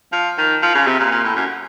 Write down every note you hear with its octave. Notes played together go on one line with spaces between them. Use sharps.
F3
D#3
F3
C#3
C3
A#2
A#2
A2
F#2